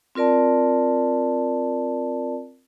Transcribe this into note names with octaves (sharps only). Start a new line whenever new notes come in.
C4 F4 A#4 D5 A5